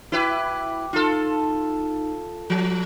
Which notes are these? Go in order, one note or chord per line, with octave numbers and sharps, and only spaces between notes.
E4 F#4 B4 G5 D6
D#4 F4 A4
F3